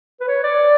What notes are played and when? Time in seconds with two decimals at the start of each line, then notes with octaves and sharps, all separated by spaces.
0.20 B4
0.28 C#5
0.44 D5